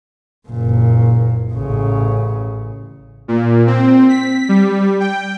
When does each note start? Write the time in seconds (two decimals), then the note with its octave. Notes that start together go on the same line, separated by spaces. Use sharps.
0.48 F#1 A#2
1.53 A1 C#3
3.28 A#2
3.67 C4
4.09 B6
4.49 G3
5.00 G5